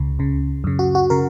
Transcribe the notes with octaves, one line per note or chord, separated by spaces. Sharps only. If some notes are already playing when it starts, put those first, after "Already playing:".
Already playing: C#2 C#3
C#2 C#3
F#2 C#3
F#4
F#4
C#3 A#4